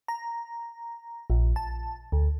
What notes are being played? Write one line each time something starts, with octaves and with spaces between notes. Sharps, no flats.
A#5
A#1
A5
D2